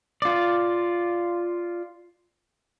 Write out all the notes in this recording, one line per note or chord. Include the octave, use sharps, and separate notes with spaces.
F4 D5